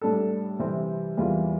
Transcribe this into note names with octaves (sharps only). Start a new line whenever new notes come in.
A2 G3 D4 A4
C3 E3 G3 C4
E2 E3 G3 A#3 F4